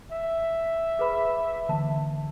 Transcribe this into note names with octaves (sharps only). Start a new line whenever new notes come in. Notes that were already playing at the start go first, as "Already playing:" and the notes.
E5
G#4 B4 B5
D3 E3 A#3 A5